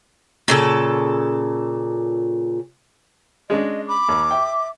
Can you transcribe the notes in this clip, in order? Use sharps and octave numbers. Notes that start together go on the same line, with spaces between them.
A#2 C#3 A4
G#3 C#4 D4 D#5
B5 D6
D#2
E5 G5